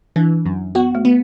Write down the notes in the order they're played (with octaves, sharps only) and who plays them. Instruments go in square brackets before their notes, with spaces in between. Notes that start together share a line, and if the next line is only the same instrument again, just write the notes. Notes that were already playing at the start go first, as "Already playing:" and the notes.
[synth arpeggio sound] E3 [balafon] D4
[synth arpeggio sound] F#2
[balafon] B3 [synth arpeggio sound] F#4
[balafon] A3
[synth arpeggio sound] B3